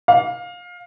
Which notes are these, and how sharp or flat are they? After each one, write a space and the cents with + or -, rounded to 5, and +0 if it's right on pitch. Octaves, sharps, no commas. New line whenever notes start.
F5 +20